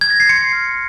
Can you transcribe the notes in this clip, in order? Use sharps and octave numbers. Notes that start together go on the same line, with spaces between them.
G#6
A#6
C7
C6 C#7
F6